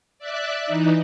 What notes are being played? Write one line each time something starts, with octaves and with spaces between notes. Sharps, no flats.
D5 E5 F#6
E3 D#4